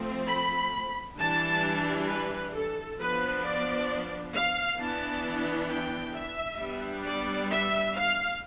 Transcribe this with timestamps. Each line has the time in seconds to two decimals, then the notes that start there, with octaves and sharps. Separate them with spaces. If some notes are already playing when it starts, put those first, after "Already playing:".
Already playing: F3 A3 C4
0.28 B5
1.18 E3 G3 D4 A5
2.09 B4
2.54 A4
2.99 F3 B3 D4 B4
3.44 D5
4.34 F5
4.79 E3 B3 D4 A5
5.69 G5
6.14 E5
6.60 G3 B3 D4
7.04 D5
7.50 E5
7.95 F5